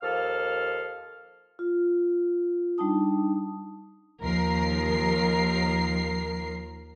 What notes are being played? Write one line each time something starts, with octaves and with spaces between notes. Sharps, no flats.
D#2 F3 A4 F5 F6
F4
G3 D4 D#4 A5 D#6
D#2 D#3 F3 A#4 C7